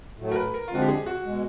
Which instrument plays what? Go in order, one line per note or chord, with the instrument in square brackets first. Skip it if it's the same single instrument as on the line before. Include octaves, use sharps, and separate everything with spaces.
[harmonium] A2 F#3 A3
[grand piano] A#4
B4
A#4
F4
[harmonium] D3 F3 G#3 C4 [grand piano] F#4
[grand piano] G4
G#4
F#4
[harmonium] B2 G#3